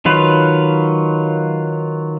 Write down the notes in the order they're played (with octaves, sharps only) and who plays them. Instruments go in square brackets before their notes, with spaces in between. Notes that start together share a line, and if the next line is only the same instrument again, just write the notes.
[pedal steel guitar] D#3 F#3 F4 B4